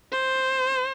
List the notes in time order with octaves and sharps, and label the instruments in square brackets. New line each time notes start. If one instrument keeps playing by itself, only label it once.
[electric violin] C5